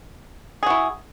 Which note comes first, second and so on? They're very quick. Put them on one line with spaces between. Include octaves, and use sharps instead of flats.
G#4 F#4 E4